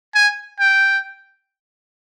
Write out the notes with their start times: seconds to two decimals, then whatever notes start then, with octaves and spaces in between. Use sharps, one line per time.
0.15 G#5
0.60 G5